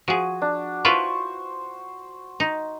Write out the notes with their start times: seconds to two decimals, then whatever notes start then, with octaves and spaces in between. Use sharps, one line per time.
0.08 F3 F#4 G#4
0.42 D4
0.85 E4 F4 B4 C5 C#6
2.40 D#4